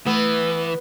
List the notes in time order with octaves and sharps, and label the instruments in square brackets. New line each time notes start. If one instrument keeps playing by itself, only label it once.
[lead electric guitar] E3 [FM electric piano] A3 [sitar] B3